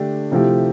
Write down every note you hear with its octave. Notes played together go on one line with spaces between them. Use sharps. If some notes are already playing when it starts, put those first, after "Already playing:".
Already playing: D3 A3 D4 G4
C3 F3 A3 E4 G4